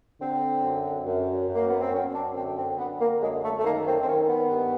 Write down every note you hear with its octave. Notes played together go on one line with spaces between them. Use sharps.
D3 C4
F#2
F#2
F#2
A#3
B3
C4
F#2 C#4
D4
D3 C4
C4
D3 B3
A#3
F#2 G#3
A3
A3
D#3 A#3
C4
C4
D#3 C#4
B3
G2